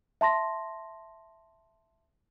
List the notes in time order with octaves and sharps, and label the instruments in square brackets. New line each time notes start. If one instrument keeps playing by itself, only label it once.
[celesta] E5 A5 C6 A#6